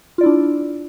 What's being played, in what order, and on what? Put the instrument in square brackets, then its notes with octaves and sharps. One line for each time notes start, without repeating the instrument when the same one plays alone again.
[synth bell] F4
D5
E4
D4